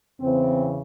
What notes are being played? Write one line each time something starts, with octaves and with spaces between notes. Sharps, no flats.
E2 C#3 E3 C4